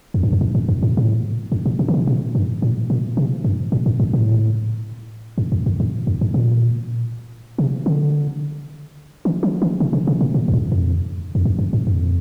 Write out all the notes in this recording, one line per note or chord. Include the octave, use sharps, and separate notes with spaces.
F2
G2
F2
G2
G2
F2
G2
A2
G2
A2
A#2
D3
C3
A#2
G2
A2
A#2
C3
G2
A2
G2
G2
A2
G2
F2
F2
G2
F2
G2
A#2
C3
D3
D#3
F3
D#3
C3
C3
C3
A#2
A2
F2
G2
F2
F2
G2
G2
G2
F2